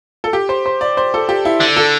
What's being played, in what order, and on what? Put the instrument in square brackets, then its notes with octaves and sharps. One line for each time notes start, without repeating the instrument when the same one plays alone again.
[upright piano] A4
G4
C5
C5
D5
C5
A4
G4
E4
[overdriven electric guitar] D3
[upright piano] A4